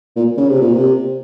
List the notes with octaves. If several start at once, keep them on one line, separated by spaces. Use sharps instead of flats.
A#2
C#3
C3
A#2
C3